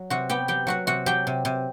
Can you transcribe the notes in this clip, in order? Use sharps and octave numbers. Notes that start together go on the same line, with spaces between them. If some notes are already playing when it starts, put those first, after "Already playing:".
Already playing: F#3
C3 F#4 F#5
B3 G4 G5
F#3 G4 G5
F#3 F#4 F#5
C3 F#4 F#5
F#3 G4 G5
C3
C3